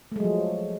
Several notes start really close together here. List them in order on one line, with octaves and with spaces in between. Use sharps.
A3 G#3 F#3 F3